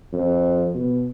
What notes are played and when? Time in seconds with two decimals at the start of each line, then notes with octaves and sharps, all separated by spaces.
0.13 F2
0.75 B2